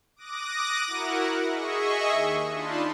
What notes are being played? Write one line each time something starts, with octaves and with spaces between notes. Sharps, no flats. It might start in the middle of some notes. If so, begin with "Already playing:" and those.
D6 D#6 F#6 A#6
E4 F#4 A#4 F#5
G#4 D#5 E5 C#6
D#2
D4 D#4 F4 A5 B5 C6